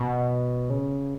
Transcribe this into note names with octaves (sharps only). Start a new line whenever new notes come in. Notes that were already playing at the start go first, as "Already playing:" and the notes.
Already playing: B2
C#3